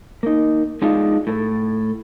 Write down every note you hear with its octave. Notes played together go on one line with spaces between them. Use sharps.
A#3 D#4
G#3 D4 D#4 F4
A2 A4